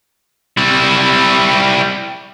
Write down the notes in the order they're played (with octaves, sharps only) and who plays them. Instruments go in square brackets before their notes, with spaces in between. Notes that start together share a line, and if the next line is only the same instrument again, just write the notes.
[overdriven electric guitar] G3 E4